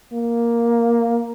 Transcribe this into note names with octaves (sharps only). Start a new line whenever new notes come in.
A#3